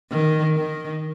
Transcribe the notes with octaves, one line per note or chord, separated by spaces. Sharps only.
D#3
D#3